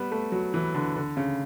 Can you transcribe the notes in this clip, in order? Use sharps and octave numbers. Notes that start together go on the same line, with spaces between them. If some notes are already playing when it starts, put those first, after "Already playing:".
Already playing: G3 B3
A3
F#3
E3
D3
D3
C#3